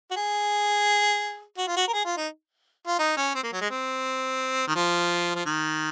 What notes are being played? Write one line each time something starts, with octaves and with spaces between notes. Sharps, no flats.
F#4
G#4
F#4
F4
F#4
A#4
G#4
F4
D#4
F4
D#4
C#4
C4
A#3
F#3
G#3
C4
D#3
F3
F3
D#3